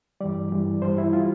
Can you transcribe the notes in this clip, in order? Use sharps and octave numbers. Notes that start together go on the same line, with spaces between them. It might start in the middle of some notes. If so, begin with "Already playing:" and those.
G2 E3 G3 D5
G2 E3 G3
G2 E3 G3 C5
E4
E3 G3 F4